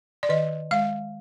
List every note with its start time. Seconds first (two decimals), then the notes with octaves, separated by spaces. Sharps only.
0.23 D5
0.29 D#3 D#5
0.71 G#3 F5